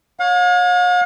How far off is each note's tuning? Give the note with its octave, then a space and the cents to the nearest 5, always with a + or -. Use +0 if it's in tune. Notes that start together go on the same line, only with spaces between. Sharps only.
C#5 +0 F5 +45